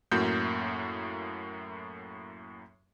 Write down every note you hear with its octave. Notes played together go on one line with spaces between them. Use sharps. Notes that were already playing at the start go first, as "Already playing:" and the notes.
F#2 A2 A#3 F#4 G6